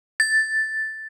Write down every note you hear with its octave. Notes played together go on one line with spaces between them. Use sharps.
A6